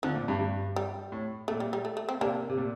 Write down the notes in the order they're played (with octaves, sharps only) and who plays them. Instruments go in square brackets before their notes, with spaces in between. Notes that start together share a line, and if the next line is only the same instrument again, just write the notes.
[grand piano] D3 [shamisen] F3
[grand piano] A#2
G2
G2
[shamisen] G3
[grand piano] A2
[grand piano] A#2 [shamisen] A3
[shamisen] G3
G3
A3
A3
C4
[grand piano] C3 [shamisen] A#3 D4
[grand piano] C3
A#2